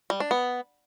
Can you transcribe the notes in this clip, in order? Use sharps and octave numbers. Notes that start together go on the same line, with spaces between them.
G3
D4
B3